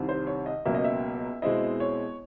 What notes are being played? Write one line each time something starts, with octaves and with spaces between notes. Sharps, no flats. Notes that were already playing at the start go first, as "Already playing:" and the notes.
Already playing: C2 C3 D#3
C5
C#5
D#5
C#2 B2 F#3 A#3 E5
D#5
E5
B2 G#3 C4 E4 D#5
C#5